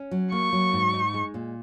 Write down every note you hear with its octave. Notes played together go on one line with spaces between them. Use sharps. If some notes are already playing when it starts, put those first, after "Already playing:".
Already playing: C#4
F#3
A#3 C#6
F#3
G#2
D#4
G#3
A#2